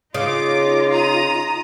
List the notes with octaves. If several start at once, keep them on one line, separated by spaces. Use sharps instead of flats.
C#3 D#4 F4 D6
A#5 D#6